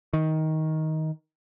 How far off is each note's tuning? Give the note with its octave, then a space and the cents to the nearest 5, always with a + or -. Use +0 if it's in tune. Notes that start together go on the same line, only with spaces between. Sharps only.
D#3 +15